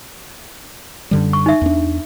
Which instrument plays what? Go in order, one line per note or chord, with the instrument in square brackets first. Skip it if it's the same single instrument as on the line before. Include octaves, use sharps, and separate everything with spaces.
[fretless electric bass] F#2 D3 G3
[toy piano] C#6
D#4 E5
[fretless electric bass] E2 D4